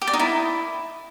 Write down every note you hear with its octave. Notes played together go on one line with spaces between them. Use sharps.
G4
D5
D#4
E4